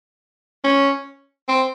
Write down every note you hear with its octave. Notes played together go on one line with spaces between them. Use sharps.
C#4
C4